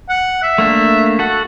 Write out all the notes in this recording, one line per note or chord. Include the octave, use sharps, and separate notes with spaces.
F#5
E5
A3 A#3 D4
F#4 A4 F#5